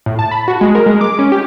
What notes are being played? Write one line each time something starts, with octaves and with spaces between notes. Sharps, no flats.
A2
A5
B5
F#4
G#3
A#4
G#3
D6
C#4
G4